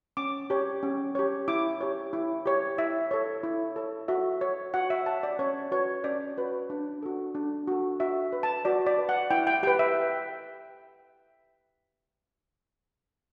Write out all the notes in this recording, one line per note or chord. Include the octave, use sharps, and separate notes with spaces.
C#4 D6
G4 C#5
C#4
G4 C#5
E4 D6
G4 C#5
E4
G4 C#5
E4 E5
A4 C#5
E4
A4 C#5
F#4 E5
C#5
F#4 F#5
E5
C#5 A5
D5
C#4 C#5
F#4 B4 C#5
C#4 D5
F#4 B4
D4
F#4 A4
D4
F#4 A4
F#4 E5
B4
A5
F#4 D5
D5
B4
F#5
E4 G5
G5
G4 B4 G5
E5